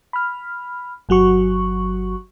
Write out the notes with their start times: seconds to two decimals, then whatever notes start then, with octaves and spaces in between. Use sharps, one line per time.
0.13 B5 F6
1.09 G1 F#3 F#4 C#6